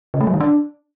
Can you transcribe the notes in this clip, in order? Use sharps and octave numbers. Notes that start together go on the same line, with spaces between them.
C#3
A3
F#3
D#3
D4